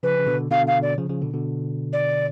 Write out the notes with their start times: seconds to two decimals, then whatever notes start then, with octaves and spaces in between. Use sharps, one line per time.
0.03 C#3 F3 B4
0.19 C#3
0.27 B2 D3
0.51 B2 D3 F5
0.67 F5
0.82 D5
0.98 C#3 F3
1.09 C#3 F3
1.21 B2 D3
1.34 B2 D3
1.93 D5